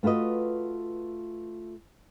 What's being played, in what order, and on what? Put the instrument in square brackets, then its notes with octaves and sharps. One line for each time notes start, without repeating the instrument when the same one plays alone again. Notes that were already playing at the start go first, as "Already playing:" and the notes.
[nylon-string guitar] A3 F4 F#4 B4 D#5